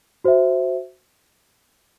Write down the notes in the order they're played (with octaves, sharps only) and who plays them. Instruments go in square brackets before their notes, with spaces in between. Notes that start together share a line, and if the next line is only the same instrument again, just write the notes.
[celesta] F#4 C5 E5